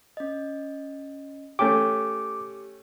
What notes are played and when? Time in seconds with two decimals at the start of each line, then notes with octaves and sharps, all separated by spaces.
0.17 C#4 D#5
1.59 A3 C#4 G4 G5 D6